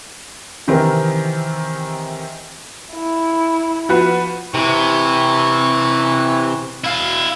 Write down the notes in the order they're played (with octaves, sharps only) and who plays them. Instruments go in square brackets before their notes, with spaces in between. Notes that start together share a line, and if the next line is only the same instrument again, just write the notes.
[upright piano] C3 D#3 E3 C4 A#4
[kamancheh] E4
[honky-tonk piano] F3 F#4 B4
[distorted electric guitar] C3 [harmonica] E3 C#6
[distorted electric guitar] E4 F5